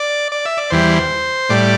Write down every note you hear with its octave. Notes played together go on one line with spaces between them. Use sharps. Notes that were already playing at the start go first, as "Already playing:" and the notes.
Already playing: D5
D5
E5
D5
E2 E3 G3 C5
A2 G3 D5